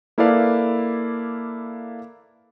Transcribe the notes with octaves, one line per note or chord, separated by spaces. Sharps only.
A#3 E4 A4 B4 D5 F5